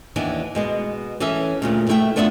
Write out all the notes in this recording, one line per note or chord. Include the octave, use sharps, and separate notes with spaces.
D#2 E3 B3 D4
B2 G#3 B3
E3 C#4 A4 E5
D2 A#2 C#3
B2 A3 E4 E5 G5
A3 B3 D4 F4 D5 E5